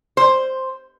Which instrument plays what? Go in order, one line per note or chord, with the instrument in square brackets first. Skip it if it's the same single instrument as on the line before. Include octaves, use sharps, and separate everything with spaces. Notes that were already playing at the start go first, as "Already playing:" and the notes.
[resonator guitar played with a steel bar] C5